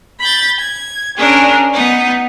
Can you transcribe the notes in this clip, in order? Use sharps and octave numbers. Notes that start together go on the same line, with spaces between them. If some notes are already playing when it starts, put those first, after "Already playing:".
B5 G6 A6
G#6
C#4 D4 G#4 A#4
B3 D#4